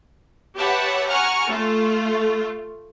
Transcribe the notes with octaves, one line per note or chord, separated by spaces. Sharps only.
G4 B4 C#5 E5 F#5 A5
F#5 G#5 A#5 C#6 F6
A3 F4